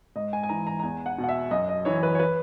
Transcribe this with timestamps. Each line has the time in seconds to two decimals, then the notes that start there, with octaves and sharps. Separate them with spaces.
0.16 G#2 D#5
0.33 G#5
0.43 G#5
0.49 E3 A#5
0.67 A#5
0.79 A#5
0.83 E2 G#5
1.06 F#5
1.18 B2
1.24 F#5
1.29 E5
1.51 F#2 D#5
1.69 D#5
1.85 E3 C#5
2.03 B4
2.15 C#5
2.19 B4